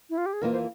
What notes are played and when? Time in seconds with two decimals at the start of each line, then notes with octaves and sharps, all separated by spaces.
0.10 E4
0.18 F4
0.26 G4
0.33 G#4
0.41 F2 E3 A#3 F4 A#4
0.52 C5